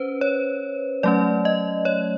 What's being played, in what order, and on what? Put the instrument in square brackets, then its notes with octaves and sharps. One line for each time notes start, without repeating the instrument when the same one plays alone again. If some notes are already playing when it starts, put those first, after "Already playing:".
Already playing: [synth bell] C#4 B4 C5
C#5
F#3 A3 C#4 D5
D#5
C#5